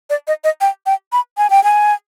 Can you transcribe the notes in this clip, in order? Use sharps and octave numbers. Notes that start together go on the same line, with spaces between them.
D5
D#5
D#5
G5
G5
B5
G#5
G5
G#5